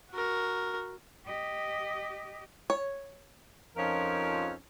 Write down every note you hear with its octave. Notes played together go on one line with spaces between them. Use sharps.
F#4 A#4
G4 D#5
C#5
F2 F3 C#4 D#4 A#4